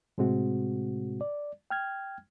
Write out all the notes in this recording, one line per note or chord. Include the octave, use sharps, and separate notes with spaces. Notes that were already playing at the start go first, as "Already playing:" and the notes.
A2 C3 G#3 C4 F#4
D5
G5 F6 G#6